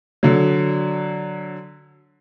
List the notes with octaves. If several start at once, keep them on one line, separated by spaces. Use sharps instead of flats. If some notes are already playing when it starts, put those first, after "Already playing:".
D3 F#3